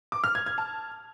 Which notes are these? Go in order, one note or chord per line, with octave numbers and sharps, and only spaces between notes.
D6
F6
G#6
G#6
A5